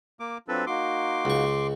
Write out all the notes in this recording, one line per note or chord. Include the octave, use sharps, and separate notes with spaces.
A#3 D6
F#3 C4 D4 F4 A4 B4
A#3 D#4 F#4 C6 D6
C#2 C#6